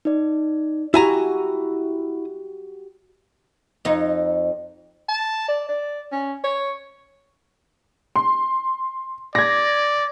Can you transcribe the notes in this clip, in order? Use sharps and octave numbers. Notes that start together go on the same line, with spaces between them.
D#4 D5
E4 F#4 G4 G#5 A#5
F2 D#4
A5
D5
D5
C#4
C#5
C6
D5 G#6 A#6